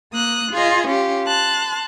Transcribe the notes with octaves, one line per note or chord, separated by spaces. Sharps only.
A#3 D#6 F#6
F4 G#4 D#5
C#4 F4 G4
A5 C6 F#6